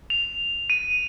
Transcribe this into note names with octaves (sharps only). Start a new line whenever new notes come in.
F7
D#7